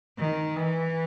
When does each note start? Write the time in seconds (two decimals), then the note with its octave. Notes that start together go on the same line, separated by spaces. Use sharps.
0.19 D#3
0.56 E3